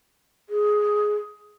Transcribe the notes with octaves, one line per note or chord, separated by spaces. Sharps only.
G#4